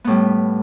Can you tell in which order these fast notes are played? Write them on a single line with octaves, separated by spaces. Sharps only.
B3 A2 G3